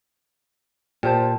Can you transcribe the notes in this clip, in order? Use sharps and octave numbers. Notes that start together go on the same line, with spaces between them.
A#2 G4 C5 A5